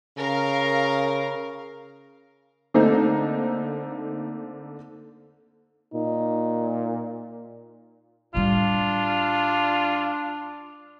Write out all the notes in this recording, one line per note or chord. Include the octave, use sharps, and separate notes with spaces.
C#3 A#4 F5
D3 A3 A#3 C4 D#4
A#2 D#4
A2 G3 D4 F4